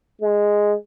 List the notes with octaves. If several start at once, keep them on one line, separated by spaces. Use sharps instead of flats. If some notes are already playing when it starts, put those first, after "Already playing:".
G#3